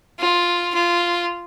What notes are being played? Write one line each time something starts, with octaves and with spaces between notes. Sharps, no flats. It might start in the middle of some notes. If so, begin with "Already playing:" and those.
F4
F4